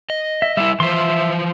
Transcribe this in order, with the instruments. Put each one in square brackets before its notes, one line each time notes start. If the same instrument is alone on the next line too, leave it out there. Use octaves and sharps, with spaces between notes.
[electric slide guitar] D#5
[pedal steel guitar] E5
[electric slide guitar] G3 E4 [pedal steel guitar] E5
[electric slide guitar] E3 F3 C5 [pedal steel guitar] E5 C6